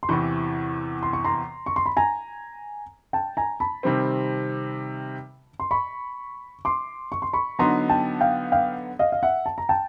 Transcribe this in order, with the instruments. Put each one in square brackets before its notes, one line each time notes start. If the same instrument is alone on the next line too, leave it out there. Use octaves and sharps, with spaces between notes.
[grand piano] C6
[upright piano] E2 C3 E3 [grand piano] B5 C#6
[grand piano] C6
C#6
A#5 C6
C#6
C6
B5
G#5 A#5
G5 A5
G#5 A#5
A5 B5
[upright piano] C3 D#3 G3 C4
[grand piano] C6
B5 C#6
C6 D6
C#6
C6
B5 C#6
[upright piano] D3 F#3 B3 D#4 [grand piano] A#5 C6
[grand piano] G5 A5
F5 G5
F5 G5
D#5 F5
F5
E5 F#5
A5
A#5
G5 A5